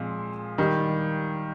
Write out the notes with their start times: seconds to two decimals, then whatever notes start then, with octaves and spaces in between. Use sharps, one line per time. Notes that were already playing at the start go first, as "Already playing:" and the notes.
Already playing: A#2 F3 G#3 C4
0.58 D#3 G3